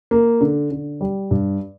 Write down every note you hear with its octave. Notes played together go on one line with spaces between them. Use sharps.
A#3
D3
D3
G3
G2